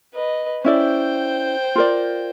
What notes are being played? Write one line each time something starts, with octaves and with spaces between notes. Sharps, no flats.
B4 D#5
C#4 E4 C5 D5 G5
F4 A#4 D5